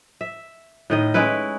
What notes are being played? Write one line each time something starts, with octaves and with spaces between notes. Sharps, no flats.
E5
A2 D#3 D#5
G#3 C#4 E4 B4